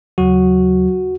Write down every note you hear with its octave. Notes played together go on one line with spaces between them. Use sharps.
D#2 C#3 F#3 F#4